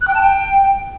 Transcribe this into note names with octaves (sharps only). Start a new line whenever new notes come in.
F#6
G5
A5
G5